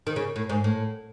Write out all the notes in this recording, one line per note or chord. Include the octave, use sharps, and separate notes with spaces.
D#3
C#3
A2
G#2
A2